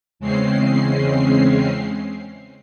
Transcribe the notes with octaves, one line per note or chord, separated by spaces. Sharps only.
E2 C#3 G#3 C4 C#4 C7